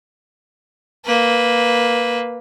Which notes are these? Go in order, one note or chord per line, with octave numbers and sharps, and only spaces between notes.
A#3 B4